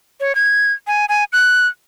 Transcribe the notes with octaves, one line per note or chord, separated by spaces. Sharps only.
C#5
G#6
G#5
G#5
F#6